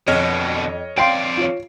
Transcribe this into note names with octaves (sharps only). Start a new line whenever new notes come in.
F2 B2 D3 C#5 D#5 F6
F2 D5 F5 G5 C6 C7 D7
F4 C#5